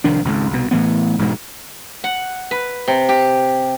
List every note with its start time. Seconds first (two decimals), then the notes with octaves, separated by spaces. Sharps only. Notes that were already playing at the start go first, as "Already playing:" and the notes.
0.04 C2 D#3 F3 D4
0.24 G#1 C#2 G#2
0.50 C2 B2
0.71 A2 E3 B3
1.18 E1 G#2 B2 G#3
2.04 F#5
2.51 B4
2.88 C3
3.09 G4